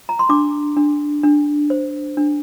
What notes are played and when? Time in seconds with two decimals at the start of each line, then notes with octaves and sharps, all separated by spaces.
0.09 A#5
0.19 C6
0.29 D4 D6
0.77 D4
1.24 D4
1.70 C5
2.17 D4